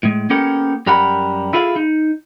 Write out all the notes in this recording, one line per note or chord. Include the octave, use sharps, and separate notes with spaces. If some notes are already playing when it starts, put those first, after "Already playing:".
A2 G#3
A#3 B3 C#4 G4 A4 A#4
F#2 G3 G4 A#4 F#5 B5
E4 F4 G#4 A4 F5
D#4